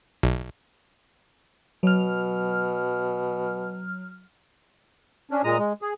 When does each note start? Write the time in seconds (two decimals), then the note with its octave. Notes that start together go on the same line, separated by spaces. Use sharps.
0.23 B1
1.83 B2 F#3 F6
5.31 C#4 D4
5.44 A#2 G#3 A#5 D#6
5.59 G#3
5.82 G#4